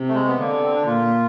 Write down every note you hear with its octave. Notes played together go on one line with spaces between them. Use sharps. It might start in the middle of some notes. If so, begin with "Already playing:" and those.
Already playing: C3
A3
G#3
B3
D3 A#3
B3
C4
D4
A#2 F4